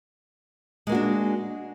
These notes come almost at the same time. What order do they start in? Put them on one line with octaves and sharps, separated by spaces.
G#3 A#3 F#4 D4